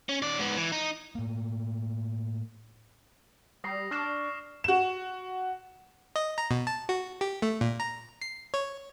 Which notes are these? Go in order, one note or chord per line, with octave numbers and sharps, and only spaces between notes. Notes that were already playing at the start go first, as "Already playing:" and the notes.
C#4
D#3 D5
G#2 B3
E3
D#4
A2 A#3
G3 D#6 A#6 C7
D4 C#6 F6 C7 E7
F#4 E7
D#5
A#5
B2
A5
F#4
G4
A3
A#2
A#5
C7
C#5